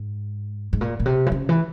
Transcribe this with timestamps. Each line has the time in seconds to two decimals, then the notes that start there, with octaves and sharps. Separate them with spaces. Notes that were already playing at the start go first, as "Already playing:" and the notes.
Already playing: G#2
0.73 G#2
0.81 A#2
1.00 A#2
1.06 C3
1.27 E3
1.32 C#3
1.49 E3